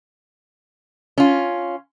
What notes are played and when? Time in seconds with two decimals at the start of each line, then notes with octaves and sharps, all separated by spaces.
1.18 C#4 F4